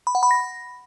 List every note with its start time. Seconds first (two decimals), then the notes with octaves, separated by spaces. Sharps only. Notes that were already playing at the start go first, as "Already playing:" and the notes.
0.07 B5
0.15 F#5
0.23 B5
0.31 A#6